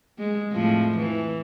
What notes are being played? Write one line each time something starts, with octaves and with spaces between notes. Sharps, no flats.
G#3
F2 A2 F3
E3